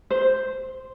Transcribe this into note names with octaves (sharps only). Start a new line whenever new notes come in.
C5